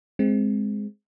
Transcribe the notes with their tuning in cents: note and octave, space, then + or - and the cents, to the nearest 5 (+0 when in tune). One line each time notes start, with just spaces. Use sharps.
G#3 +0 C4 +0